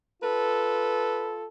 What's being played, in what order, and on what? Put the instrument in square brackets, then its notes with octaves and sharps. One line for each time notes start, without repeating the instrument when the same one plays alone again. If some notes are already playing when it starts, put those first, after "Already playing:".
[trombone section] F4 A4 [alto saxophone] B4